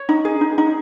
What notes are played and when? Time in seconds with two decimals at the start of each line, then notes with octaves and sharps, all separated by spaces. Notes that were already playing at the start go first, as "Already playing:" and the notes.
Already playing: C#5
0.09 D#4
0.25 G#4
0.41 D#4
0.58 D#4